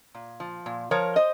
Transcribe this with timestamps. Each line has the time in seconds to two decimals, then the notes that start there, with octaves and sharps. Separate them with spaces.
0.15 A#2
0.40 F3
0.66 A#2
0.91 F3 A#4 C#5
1.16 C5 D#5